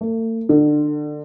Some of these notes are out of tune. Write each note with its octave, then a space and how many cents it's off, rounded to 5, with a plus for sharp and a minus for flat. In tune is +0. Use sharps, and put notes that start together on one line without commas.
A3 +45
D3 +30